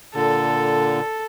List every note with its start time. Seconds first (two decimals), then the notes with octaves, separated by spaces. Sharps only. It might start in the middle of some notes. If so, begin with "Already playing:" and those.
0.15 A#2 D3 A4